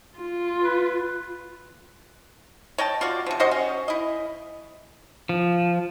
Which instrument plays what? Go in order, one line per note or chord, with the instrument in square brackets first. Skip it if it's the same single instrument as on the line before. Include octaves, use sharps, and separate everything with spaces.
[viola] F4
[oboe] B4
[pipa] C#5 D#5 G5 A5
F4 F#4 D5
C3 F3
C3 F#4 C5 D#5
C#4
E4 D#5
[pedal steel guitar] F3